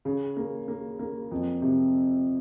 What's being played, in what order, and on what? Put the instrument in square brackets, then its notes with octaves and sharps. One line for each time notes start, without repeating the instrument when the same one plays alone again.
[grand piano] C#3
A#3
A#3
A#3
F2
C3